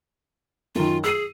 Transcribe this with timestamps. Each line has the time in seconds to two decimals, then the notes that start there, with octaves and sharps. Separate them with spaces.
0.75 F#2 D#3 F4
1.04 G#4 E6 C7 D#7